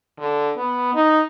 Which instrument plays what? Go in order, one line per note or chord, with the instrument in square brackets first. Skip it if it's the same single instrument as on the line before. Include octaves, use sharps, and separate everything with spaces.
[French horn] D3
B3
D#4